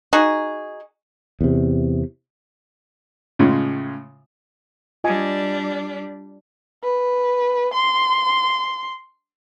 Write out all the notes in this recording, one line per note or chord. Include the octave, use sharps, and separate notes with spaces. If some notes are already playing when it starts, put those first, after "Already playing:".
D#4 F#4 G#4
E2 C3
A2 C#3 G#3 F4
G3 D4 F4 D#5 G#5
B4
C6